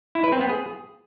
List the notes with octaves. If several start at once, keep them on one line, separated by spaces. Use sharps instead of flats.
E4
B4
C4
B3
G#4